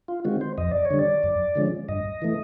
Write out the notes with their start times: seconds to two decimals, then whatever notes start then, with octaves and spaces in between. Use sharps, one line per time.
0.08 F4
0.25 D#3 G#3 C4 F#4
0.41 C5
0.58 F2 D#5
0.71 D5
0.85 C#5
0.90 D3 G3
0.99 D5
1.23 F#2
1.55 D3 F3 G#3 C#4
1.89 G2 D#5
2.22 E3 A3